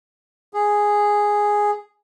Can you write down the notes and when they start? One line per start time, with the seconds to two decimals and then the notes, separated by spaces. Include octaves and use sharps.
0.53 G#4